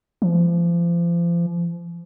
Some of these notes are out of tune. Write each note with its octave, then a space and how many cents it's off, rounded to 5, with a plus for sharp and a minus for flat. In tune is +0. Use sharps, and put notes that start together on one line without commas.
F3 -35